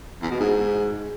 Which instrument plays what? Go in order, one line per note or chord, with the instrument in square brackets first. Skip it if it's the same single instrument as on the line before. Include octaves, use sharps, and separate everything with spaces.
[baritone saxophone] E2
B2
G#2